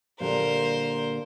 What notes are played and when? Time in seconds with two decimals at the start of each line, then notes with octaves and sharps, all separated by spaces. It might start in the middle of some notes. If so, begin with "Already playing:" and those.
0.20 A#2 D3 G3 A#4 C5